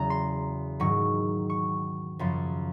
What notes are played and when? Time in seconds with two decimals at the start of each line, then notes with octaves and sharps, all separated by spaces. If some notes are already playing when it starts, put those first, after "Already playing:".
Already playing: E2 C#3 F#3 A#5
0.10 C6
0.80 G#2 D#3 F#3 C#6
1.50 C#6
2.19 F#2 C#3 F3 C6